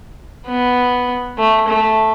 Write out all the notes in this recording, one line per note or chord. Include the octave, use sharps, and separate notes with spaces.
B3
A3
A3